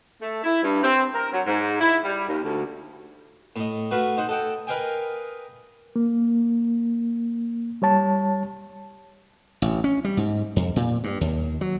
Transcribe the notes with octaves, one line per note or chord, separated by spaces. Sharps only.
A3
E4
G2
C4
A#4
F#3
G#2
E4
G3
D#2
D2
A2 D#5
A3 F#4 B4 F5
D#4 C5 F#5
A4 D#5 F#5 G5
A#4 B4 D#5 F5 G5 G#5
A#3
G3 C#5 A5
A1
C#4
G3
G#2
F2
A#2
G2
D#2
F#3